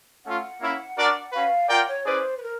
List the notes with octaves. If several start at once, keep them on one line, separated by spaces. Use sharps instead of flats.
A3 C#4 F4 F#5
A#3 C#4 E4
D4 F#4 A#4 D5
C#4 F#4 B4 F5
F4 A#4 D5 F#5 G5
C#5
C#4 E4 G#4 B4 C5 D5
B4
A#4